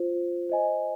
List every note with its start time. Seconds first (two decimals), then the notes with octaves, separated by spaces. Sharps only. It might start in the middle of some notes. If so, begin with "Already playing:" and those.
Already playing: F4 C5
0.49 C5 D#5 G#5